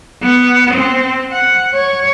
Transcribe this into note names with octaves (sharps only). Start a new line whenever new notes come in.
B3
C4
F#5
C#5